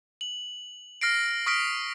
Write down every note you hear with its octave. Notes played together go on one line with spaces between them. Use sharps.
F#7
F6 A#6 C7 D7
C#6 D#6 F6 B6 D7